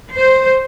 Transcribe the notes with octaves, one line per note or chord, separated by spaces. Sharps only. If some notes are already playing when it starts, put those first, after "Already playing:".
C5